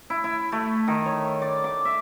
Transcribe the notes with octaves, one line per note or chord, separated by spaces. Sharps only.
E4
E4
A3
D#3
C#5
D5
D6
E5